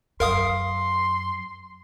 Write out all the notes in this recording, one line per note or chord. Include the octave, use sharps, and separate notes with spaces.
F#2 A#4 F5 C6 D#6